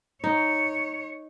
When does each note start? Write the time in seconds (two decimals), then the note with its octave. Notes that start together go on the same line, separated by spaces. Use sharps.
0.24 D#4 C#5